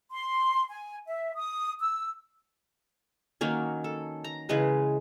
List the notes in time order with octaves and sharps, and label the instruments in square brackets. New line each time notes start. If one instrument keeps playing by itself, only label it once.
[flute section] C6
G#5
E5
D#6
E6
[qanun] D#3 F#3 A#3 C#4
A4
A#5
C#3 E3 G#3 B4